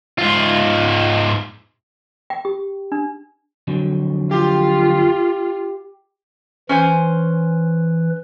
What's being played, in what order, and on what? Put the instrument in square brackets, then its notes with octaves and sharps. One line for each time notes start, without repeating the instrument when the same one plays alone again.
[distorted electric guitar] G#2 F4
[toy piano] G5
G4
D4
[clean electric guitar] F2 D3 F#3
[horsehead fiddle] F4 [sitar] G4
[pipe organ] E3 B4 [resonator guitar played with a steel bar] C#4 C5 G#5